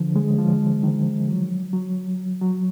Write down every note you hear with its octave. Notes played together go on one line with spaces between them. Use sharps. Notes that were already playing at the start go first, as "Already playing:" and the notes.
Already playing: D3 F3
G#3
F3
D#3
F#3
F#3
F#3